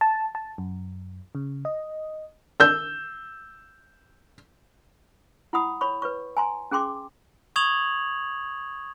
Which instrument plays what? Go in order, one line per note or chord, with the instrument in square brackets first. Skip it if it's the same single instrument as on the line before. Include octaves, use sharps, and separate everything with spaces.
[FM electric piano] A5
A5
F#2
C#3
D#5
[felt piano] E6 G6
[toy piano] E4 F#5 B5 D#6
C#5 B5 C#6
B4 C#5 C#6
G#5 A#5 C6
C#4 G#4 G5 C6 D6
[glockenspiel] C#6 D#6 G#6 F7 F#7